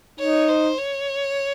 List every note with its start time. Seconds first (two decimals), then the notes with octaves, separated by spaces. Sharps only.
0.19 D#4 C#5
0.49 C5
0.78 C#5